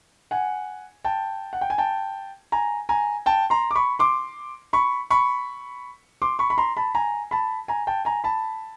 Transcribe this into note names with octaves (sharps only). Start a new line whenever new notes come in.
F#5 G#5
G5 A5
F#5
G5
G#5
G5 A5
G#5 A#5
G#5 A#5
G5 A5
A#5 C6
D6
B5 C#6
C6 D6
B5 C#6
B5 C#6
C6 D6
B5 C#6
B5
A#5 C6
A5 B5
G#5 A#5
A5 B5
G#5 A#5
G5 A5
G#5 A#5
A5 B5